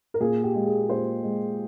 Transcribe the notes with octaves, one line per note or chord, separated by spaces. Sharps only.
A#4
A#2 G#4
G4
G#3
G#4
A#2 C5
G#3